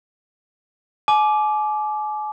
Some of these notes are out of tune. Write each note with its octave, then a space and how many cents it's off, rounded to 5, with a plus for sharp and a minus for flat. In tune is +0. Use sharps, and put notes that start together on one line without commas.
G#5 +40 D6 +0